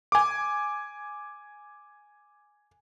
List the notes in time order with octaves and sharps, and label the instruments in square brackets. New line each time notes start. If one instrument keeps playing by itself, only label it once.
[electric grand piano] G#5 D6